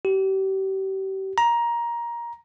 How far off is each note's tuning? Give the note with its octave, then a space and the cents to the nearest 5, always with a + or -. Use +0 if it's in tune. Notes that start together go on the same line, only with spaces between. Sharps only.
G4 -35
A#5 +15